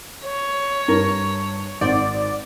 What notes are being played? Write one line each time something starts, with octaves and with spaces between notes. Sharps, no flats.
C#5
G2 A#4
G#1 D#4 C5 D5 F#5